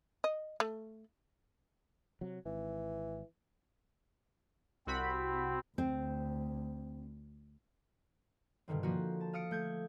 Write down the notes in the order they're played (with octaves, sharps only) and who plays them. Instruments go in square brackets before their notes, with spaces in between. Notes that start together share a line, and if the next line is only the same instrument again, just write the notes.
[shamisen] D#5
A3
[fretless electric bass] C3 F#3
[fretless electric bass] G#1 [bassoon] E3
[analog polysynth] C2 F#4 B5 [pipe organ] C4
[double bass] D2 [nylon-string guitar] C4
[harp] G2 B2 D3 D#3 C4
F3 A#3 F#4
A5
F5 D#6 F6 C#7 D7
A3 G6 G#6